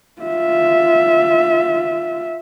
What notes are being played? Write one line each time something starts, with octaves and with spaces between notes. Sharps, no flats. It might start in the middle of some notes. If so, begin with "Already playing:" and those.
F4 E5